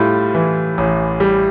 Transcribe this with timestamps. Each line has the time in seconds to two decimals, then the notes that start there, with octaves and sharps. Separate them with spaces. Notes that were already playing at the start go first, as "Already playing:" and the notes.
Already playing: A2 G3 F4
0.35 E3
0.78 A1
1.20 G3